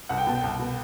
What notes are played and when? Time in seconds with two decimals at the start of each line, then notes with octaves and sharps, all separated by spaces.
0.09 C2 F#5
0.18 G5
0.26 B2 A5
0.35 G5
0.43 C2
0.59 B2